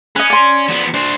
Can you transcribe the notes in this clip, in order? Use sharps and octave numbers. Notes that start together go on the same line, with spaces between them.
C#4 B4 D#5
D5 C6
F3 B3
D4 C5